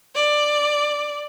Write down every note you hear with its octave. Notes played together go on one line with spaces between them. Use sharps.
D5